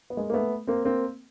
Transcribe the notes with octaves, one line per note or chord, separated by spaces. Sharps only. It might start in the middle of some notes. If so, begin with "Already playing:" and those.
B3
G#3 A#3
A#3
A3 B3
A#3 C4
A#3 C4